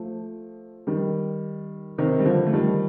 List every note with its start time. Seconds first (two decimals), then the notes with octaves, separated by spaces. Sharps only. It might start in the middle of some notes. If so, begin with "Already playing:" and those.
Already playing: F3 A3
0.87 D#3 G3
1.98 C3 D#3
2.19 G3
2.25 D3 F3
2.47 A3
2.53 D#3 G3